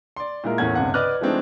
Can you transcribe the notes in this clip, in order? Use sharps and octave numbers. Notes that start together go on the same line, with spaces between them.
D5 C6
A#2 G#3 E4 F4 A#4
E2 A2 C#4 A#4 F#5 G#6
G1 C#2 C3 F#5
B4 D5 D#5 D6 F6 F#6
F3 G#3 A3 C4 D4 D#4